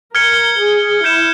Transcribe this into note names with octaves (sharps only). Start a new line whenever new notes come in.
A#4 F6 G#6 C#7 G7
G#4
E4 G6 C#7 E7